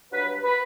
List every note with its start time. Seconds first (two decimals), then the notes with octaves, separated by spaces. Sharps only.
0.12 G2 F#3 B4
0.43 B4